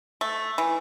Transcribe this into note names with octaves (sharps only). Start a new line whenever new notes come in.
A3
E3